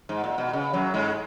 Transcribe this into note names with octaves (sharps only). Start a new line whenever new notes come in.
G#2
A#2
B2
C#3
F#2 F#3
G#2 G#3